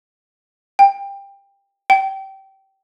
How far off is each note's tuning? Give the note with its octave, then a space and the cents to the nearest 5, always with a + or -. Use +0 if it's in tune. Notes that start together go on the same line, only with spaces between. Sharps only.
G5 +20
G5 -20